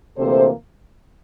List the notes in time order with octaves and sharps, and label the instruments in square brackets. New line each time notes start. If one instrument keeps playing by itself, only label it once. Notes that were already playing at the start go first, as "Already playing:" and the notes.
[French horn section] D2 C3 E3 A#3 A4 C5